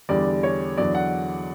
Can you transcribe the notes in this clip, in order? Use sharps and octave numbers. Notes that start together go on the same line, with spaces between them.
E2 D3 G3 D5
C#5
E2 D3 F#3 D5
F#5